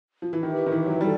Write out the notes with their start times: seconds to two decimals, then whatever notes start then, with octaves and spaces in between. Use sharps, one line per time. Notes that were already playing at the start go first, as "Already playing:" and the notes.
0.22 F3
0.33 E3
0.43 D#3 G4 B4 E5
0.66 D#3
0.72 E3
0.86 F#3
1.01 G3 E4 A4 D5